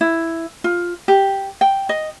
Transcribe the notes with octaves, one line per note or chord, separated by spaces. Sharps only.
E4
F4
G4
G5
D#5